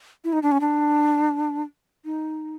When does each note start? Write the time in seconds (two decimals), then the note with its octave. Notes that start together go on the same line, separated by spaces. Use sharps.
0.24 E4
0.33 D#4
0.43 D4
0.52 C#4
0.61 D4
2.05 D#4